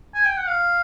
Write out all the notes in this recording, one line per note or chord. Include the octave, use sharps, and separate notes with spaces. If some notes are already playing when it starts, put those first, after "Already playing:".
G#5
G5
F#5
F5